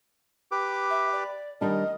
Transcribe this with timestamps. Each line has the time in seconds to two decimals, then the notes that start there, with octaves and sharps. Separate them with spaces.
0.51 G4 B4 D6
0.90 E5
1.13 D5
1.61 D#3 G3 D4 A#4 D#5